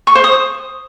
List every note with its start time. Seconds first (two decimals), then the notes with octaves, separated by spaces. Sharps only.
0.07 C#6
0.15 C5
0.24 D#6